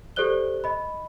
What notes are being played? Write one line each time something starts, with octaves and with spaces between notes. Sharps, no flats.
G4 A4 C5 D5 F#6 G7
D#5 B5